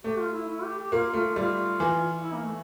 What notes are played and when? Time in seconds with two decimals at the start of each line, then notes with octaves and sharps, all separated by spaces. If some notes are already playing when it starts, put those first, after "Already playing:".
0.04 A3 G4
0.20 F4
0.33 E4
0.48 E4
0.63 G4
0.78 G4
0.92 A#3 F4
1.13 A3 F4
1.36 G3 F4
1.80 E3
2.23 E4
2.34 A#3
2.44 A3